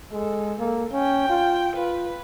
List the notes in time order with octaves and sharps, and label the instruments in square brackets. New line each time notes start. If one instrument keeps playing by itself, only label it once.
[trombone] G#3 [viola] A4
[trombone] A#3 [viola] A4
[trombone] C#4 [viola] G5
[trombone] F4
[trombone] F4 [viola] B4